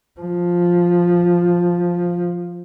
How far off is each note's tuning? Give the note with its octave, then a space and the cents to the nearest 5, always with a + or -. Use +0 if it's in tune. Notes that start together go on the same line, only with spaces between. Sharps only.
F3 +5